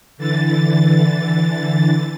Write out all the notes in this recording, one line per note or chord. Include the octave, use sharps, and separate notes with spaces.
D3 E3 A6